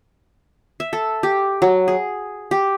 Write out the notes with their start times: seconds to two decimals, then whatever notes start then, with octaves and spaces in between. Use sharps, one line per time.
0.80 E5
0.93 A4
1.23 G4
1.62 F#3
1.88 G#4
2.51 G4